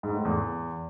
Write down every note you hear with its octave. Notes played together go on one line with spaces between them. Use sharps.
G#2
A2
E2